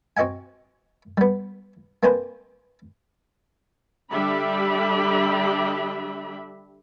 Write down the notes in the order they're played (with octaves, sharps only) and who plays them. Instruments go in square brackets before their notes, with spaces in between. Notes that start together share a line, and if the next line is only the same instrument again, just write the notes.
[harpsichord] C4 F#4 D#5 F#5 G#5
G3 B3
A#3 C4 D4 G#4 B4 C5
[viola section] D3 G3 D4 G4 E5 B5